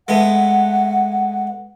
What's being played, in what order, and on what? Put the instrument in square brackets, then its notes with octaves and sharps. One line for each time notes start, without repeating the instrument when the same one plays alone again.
[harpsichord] G#3 A3 B3 [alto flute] F#5